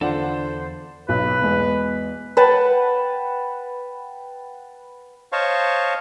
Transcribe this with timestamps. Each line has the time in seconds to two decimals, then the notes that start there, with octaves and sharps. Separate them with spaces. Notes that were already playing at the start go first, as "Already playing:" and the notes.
0.01 E2 D3 F4 A4 C5 D5 F#5
1.09 B1 B4
1.42 E2 G#3 B3
2.37 B4 F#5 G5 A5
5.32 C5 C#5 D#5 F5 A5 C#6